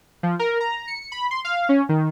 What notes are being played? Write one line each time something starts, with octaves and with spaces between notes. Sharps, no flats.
F3
A#4
A#5
C#7
B5
C6
F5
C#4
D#3